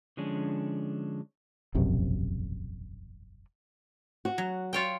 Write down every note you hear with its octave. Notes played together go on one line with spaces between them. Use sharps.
D3 F3 G#3 C#4 D4
E1 A#1 F#2 C3
F#4
F#3
F4 C#5 G5